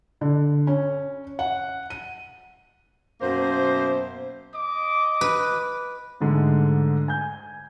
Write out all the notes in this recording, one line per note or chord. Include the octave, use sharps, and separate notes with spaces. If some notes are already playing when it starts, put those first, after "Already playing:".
D3
C#4
F#5
D#7
F#2 B2 A#3 C5
D#5 D6
B4
G#2 D3 G#3 A3
G#5 G6